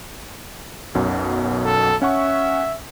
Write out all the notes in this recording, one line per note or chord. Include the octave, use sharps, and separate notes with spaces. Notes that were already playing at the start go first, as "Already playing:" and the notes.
B1 F#2 B2
A4
C#4 E5 F#5 C#6